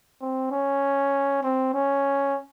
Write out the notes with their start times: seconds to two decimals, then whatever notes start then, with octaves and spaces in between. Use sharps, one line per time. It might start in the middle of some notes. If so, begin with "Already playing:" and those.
0.21 C4
0.51 C#4
1.43 C4
1.74 C#4